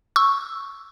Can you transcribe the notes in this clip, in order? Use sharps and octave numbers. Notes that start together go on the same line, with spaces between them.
C#6 E6